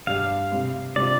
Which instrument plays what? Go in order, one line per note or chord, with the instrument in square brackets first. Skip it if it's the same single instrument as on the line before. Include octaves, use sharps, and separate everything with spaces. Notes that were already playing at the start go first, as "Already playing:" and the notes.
[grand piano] G2 G3 D4 G4 [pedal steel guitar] F5
[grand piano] C3 G3 C4
[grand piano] C3 G3 D4 F4 [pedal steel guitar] D5